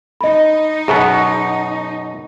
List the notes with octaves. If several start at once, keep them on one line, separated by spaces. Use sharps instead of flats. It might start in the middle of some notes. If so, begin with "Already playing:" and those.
D#4 D#5 B5
F#2 B2 B3 G#4 F#5 B5